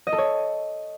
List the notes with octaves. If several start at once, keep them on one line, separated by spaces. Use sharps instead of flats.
D#5
A4
C#5